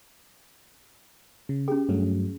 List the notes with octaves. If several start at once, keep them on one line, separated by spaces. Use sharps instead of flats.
C#3
C#4 G4 G#4
G2 F#3 A3